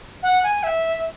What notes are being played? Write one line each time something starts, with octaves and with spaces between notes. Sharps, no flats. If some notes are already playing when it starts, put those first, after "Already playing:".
F#5
G#5
E5